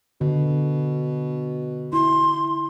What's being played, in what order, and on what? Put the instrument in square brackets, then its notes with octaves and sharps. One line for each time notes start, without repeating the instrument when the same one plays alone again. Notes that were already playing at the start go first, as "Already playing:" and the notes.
[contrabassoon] B2 [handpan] D3
[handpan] E4 [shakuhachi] C6